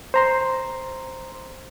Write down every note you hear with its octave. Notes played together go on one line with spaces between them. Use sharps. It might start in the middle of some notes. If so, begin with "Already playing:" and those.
C5 A#5 C6